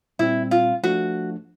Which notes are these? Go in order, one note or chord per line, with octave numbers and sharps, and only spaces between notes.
A#2 G3 C4 E4
F4
F3 A3 D4 F#4